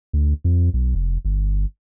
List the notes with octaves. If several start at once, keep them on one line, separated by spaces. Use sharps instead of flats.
D2
F2
B1
F1
G1